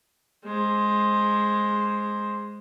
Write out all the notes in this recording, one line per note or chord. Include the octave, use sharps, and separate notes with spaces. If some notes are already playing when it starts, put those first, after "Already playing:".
G#3 C5